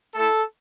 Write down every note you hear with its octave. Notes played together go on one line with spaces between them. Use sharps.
A3 E4 A4